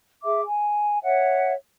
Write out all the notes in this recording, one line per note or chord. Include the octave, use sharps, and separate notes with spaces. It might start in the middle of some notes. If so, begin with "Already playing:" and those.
G#4 E5 D6
G#5
C#5 E5 F#5